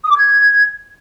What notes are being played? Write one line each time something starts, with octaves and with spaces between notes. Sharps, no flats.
D#6
D6
G#6